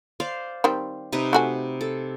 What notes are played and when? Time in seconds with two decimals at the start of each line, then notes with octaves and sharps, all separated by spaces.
0.20 C5 D5 F5
0.64 D#3 G3 C4
1.12 C3 D#4 B4
1.33 A3 F#4 G#5
1.81 A4